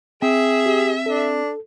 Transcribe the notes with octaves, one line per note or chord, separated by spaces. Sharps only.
C4 G#4 E5 G5
G4
D4 A4